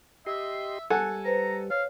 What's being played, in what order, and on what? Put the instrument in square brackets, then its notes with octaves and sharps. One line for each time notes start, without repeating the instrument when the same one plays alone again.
[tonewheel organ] G4 D#5 C6 [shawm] E5
[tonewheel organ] G3 [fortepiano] A4 F#5 G#5
[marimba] B4 C5 [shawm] A#5
[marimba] C#5 [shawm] F5